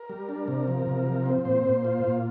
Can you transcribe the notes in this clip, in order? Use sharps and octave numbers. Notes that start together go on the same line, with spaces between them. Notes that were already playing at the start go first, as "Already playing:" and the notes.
Already playing: A#4
G3
D4
C3
F3
C3
F3
C4
A#2 C5
A#2
F4
A#2